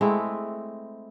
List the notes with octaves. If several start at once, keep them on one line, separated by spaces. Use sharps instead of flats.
G#3 A3 C4 E4